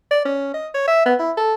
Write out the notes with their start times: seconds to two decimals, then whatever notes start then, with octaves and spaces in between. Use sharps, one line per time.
0.11 D5
0.25 C#4
0.54 D#5
0.74 C#5
0.88 E5
1.05 B3
1.19 E4
1.37 A4